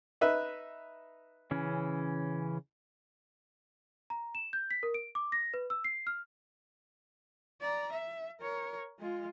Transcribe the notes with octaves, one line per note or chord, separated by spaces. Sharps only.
D#4 B4 E5
C#3 E3 C#4
A#5
E7
G6
B6
A#4
D7
D6
A#6
B4
E6
C7
F6
D5 A#5
E5
A#4 C#5
G#3 F4